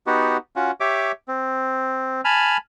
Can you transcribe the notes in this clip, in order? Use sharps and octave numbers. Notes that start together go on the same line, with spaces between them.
B3 D#4 F#4 G4
C#4 F4 F#4
G4 C#5 E5 D6
C4
G#5 A5 B5 F6